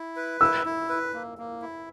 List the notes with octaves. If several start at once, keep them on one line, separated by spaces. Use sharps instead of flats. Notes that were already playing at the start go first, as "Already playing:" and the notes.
Already playing: E4
B4
E4 E6
E4
B4
A#3
A#3
E4